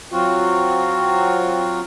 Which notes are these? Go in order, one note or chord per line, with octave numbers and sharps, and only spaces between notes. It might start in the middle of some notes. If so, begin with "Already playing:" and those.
F#3 C4 F4 F#4